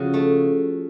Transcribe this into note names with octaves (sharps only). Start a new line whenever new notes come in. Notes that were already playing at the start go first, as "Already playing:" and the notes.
Already playing: C#3 F3 F#4
A3